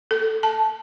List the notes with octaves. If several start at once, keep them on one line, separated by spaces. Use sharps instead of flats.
A4
A5